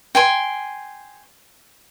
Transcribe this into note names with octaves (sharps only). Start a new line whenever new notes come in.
G5 G#5 C6